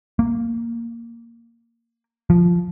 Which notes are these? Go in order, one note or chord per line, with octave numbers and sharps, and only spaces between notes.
A#3
F3